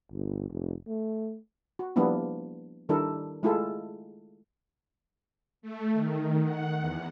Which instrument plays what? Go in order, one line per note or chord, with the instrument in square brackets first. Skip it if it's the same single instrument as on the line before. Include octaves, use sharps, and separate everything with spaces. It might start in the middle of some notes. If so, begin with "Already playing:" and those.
[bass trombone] G1
F1
A3
[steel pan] F#4
F3 G3 A#3 B3 D4 E4
D#3 G3 D4 E4 A4 A#4
G#3 A3 E4 F4 G#4 A4
[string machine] A3
D#3
F#5
E2